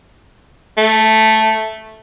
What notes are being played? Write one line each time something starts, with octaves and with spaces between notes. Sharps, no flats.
A3